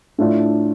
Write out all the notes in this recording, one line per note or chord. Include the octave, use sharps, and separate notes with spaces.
A2 A3 D4 F4